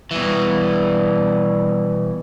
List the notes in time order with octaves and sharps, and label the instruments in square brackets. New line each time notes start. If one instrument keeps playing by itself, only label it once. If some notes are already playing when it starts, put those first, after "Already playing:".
[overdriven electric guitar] B2 E3 [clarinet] G3